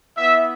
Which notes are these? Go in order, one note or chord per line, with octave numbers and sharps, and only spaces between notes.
B3 E4 E5